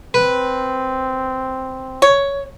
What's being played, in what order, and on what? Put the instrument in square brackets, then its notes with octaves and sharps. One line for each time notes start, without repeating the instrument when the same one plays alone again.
[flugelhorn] C4 [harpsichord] B4
[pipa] C#5